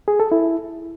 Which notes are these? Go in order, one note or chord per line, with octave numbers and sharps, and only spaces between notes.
G#4
A4
E4